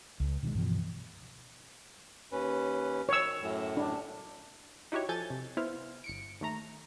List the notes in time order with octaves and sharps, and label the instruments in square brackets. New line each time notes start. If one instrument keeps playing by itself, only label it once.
[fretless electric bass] C#2
B2 D#3 E3 G#3
G2 B2 E3 F3
[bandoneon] D#2 C#4 B4
[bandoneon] D#3 [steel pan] C#5 E6
[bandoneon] F#2 A2
[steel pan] D4
[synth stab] D#4 E4 F#4 G4 C#5
F3 A4 G#5 G6 A6
C3
B3 E4 C5 F5
G1 C#7 D7
D#2 A3 A#5